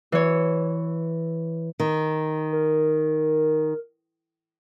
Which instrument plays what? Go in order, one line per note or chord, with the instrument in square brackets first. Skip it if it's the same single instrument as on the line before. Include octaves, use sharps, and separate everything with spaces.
[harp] E3 C#5
[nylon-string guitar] D#3
[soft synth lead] A#4